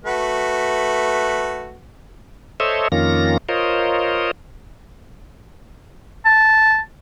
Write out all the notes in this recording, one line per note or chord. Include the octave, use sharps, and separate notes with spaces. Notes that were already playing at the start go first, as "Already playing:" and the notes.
A3 F#4 B4
A4 C5 C#5 D#5 E5
F2 D#3 A#3 C#4 F4 A#6
F4 A#4 C5 C#5 D#5
A5